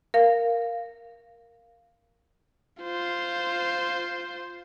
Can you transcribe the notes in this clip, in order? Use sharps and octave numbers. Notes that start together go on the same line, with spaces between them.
A#4 F5
F4 C5